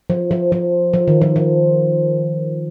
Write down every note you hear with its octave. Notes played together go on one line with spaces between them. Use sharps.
F3
F3
F3
F3
D#3
F3
F3